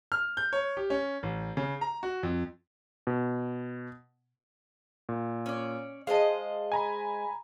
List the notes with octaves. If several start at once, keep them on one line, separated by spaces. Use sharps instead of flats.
F6
G6
C#5
G4
C#4
A1
C#3
A#5
F#4
F2
B2
A#2
C#4 D5
G#3 C5 D#5 F5 A5
G#5 A#5 B5